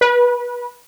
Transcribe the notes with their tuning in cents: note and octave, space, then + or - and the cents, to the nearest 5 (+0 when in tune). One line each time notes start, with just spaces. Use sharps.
B4 -25